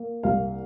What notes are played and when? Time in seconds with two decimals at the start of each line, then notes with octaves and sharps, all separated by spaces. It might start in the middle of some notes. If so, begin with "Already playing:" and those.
Already playing: A#3
0.23 C2 F5